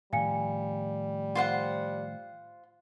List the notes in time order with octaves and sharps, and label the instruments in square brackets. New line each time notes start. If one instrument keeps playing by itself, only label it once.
[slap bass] A2 D#3 F3 [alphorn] G3 [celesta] F5 G#5 C#7
[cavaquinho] F4 C5 F#5